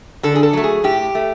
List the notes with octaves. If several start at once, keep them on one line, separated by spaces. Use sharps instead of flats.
D3 A4
G#4
A4
F#3 A3
G#4
A2 G4
A3